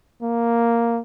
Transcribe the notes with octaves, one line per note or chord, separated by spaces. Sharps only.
A#3